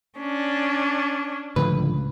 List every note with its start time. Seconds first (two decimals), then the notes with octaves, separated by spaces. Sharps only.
0.20 C#4 D4
1.56 C#2 A2 D3 F3 B4